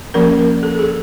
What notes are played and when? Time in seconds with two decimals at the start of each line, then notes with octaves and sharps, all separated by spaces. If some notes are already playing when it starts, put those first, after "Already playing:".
0.14 F3 A#3 C#4 A#4
0.39 A#4
0.63 A4
0.79 G#4